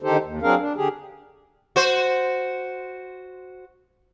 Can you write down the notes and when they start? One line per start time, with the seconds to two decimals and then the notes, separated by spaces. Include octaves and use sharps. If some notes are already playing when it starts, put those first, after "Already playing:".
0.03 D3 D#3 D#4 G4 A4 C5
0.24 D#2
0.42 F#3 C4 D4 G#4 A#4 F5
0.59 D4
0.76 D3 G4 G#4
1.76 F#4 C5